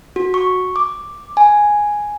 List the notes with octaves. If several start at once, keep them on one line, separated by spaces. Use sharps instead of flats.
F#4
C#6
D6
G#5